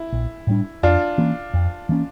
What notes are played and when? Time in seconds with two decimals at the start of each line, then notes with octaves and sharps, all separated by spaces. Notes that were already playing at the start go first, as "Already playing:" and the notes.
Already playing: E4
0.12 A#1
0.47 A2 G3 D4
0.83 F2 D4 F4
1.18 E3 A#3 C#4
1.54 F2
1.89 E3 A#3 C#4